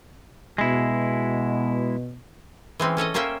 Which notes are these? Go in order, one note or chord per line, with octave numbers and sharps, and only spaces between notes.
B2 G#3 E4
E3 G#3 C4 C#4
C#4 A4 C#5 D#5
A#3 C#4 C5 C#5 E5 G5